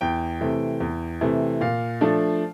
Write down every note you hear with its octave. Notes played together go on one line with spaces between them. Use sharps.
E2 G5
C3 E3 A3
E2
C3 E3 A3
A#2 F5
F3 A3 D4